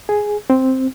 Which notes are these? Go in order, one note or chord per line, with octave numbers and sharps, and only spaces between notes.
G#4
C4